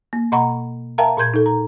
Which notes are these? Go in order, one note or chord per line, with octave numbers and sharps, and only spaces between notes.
A#3
B2 D#5 F#5 A#5 B5 C#6
A#4 E5 F5 G5 A5 A#5
A#2 A#4 C6 G6 G#6
D#4 A4
A#5